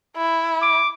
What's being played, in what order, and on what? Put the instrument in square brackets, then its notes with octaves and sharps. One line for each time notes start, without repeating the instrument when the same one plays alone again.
[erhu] E4
[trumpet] D6